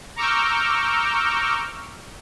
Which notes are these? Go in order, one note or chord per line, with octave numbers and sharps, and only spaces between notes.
A#5 C#6 D6 E6 F6 G6